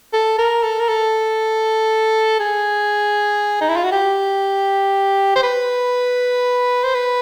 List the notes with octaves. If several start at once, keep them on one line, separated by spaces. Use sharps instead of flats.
A4
A#4
A4
A#4
A4
G#4
D#4
E4
F4
F#4
G4
C5
B4
C5
B4